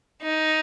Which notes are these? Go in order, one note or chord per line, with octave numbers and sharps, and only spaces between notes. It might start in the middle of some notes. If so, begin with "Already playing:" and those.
D#4